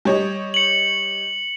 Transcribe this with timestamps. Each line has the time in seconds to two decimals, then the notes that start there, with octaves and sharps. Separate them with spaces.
0.05 G3 C#5 D#5
0.54 C#7 F#7